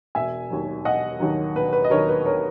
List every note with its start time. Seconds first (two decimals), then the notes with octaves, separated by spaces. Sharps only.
0.15 E1 E5 G#5
0.50 D#2 D#3 F#3
0.85 E1 D#5 F#5
1.20 D#2 D#3 F#3
1.56 E1 B4
1.73 B4
1.84 D#5
1.91 D#2 D#3 F#3 A#4 C#5
2.09 B4
2.25 E1 A#4 C#5